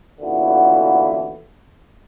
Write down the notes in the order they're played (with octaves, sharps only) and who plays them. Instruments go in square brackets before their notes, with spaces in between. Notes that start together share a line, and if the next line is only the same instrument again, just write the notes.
[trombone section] A1 A#2 D3 E3 B3 F#4